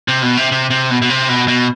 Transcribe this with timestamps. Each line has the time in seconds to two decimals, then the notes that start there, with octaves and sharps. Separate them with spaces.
0.08 C3
0.22 B2
0.37 C3
0.52 C3
0.70 C3
0.90 B2
1.02 B2
1.10 C3
1.29 B2
1.48 B2